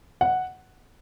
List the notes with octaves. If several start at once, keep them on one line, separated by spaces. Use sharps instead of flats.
F#5